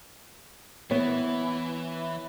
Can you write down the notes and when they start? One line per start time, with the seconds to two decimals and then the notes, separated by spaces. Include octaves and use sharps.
0.91 E3 B3 C#5